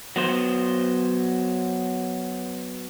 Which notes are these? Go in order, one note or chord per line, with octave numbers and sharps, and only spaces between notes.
F#3 B3 C5